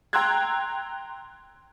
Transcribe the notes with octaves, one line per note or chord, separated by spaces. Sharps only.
G5 A#5 C6 E6 F#6 G#6